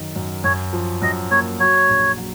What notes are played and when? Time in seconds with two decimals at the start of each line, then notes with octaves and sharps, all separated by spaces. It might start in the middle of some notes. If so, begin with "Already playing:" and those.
Already playing: F#2 D#3 F#3
0.16 F#2
0.44 F#2 C#5
0.73 F3
1.02 F#2 D#5
1.31 A#3 C#5
1.60 F#3 C#5
1.88 A#1
2.18 F#3